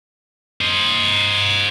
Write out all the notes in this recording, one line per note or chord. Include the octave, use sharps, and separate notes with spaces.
C5 D#5